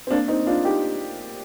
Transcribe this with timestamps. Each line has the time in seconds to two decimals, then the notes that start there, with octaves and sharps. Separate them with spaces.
0.07 C4
0.11 A#3 D4
0.28 C4 D#4
0.46 D4 F4
0.64 D#4 G4